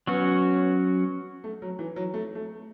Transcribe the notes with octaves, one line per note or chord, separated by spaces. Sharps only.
F#3 B3 C#4 F#4
A3
F#3
E3
F#3
A3
A3